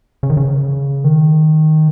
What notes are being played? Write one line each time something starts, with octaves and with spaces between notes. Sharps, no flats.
C#3
D#3
C#3
D#3